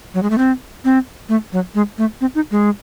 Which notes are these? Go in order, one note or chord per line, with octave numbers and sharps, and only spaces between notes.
F#3
G#3
A3
C4
C4
A3
F#3
G#3
A3
C4
D#4
G#3